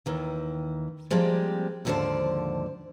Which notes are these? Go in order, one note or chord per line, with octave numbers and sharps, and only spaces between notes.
D#2 D#3 E3
F3 G3 G#3 A#3 C4
D#2 G#2 D3 F3 C5 D5